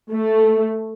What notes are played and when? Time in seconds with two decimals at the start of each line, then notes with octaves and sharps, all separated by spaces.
0.12 A3